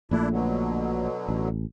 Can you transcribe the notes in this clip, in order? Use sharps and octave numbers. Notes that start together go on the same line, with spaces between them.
A#1 A#2 A3 D4 E4
B2 D3 F#3
A1